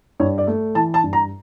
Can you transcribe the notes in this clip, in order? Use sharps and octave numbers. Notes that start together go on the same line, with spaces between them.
G2 C#5
D5
A3
E3 A5
A5
G2
A#5